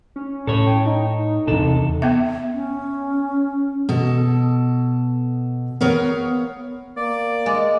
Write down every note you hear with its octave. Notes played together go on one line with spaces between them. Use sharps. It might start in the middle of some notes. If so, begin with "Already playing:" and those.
C#4
A2 A4 C#5
G5
D#4
E2 C3 D4 A4
B3 E5
C#4
B2 A4
B3 A#4 C#5 F5
A#3 D5
G#3